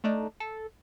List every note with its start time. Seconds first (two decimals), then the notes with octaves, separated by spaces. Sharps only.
0.04 A3 D4 D#4
0.40 A4